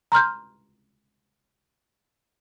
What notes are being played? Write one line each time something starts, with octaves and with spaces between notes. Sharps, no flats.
A#5 C6 F6 G6